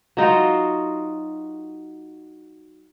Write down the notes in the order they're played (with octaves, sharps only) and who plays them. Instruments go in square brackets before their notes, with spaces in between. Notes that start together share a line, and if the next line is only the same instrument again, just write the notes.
[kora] F#3 D#4 F4 F#4